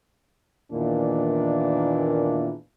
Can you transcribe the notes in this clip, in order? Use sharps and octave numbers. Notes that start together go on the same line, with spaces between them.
E2 A#2 D#3 E3 A#3 D4